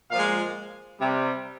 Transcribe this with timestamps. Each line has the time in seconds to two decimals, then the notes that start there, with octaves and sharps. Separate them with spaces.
0.11 A#2 F3 G#3 F5
1.01 C3 G3